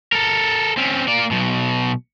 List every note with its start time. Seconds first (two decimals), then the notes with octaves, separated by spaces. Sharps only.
0.12 A4 A#4
0.77 C4 C#4
1.08 A#3 D5
1.31 B1 B2